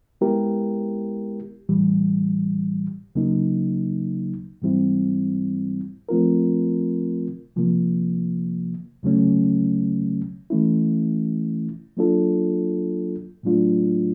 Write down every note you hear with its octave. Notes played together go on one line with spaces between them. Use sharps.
G#3 B3 E4 G4 A#4
A2 E3 G3
D2 C#3 F#3 A#3 D#4
G#2 E3 G3 C4 E4
F3 A3 C4 F4 A#4
C3 F3 A#3
D2 C#3 F#3 A3 C#4
E3 A3 C#4 E4
F#3 A#3 D4 F4 A4
A2 F#3 A3 D4 F4